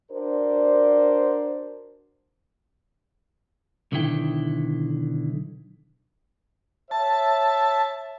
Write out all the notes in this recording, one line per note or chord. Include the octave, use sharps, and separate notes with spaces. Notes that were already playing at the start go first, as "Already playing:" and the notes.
D4 F#4 A#4 C5 D5
B1 D3 D#3 E4 G5
C#5 E5 A5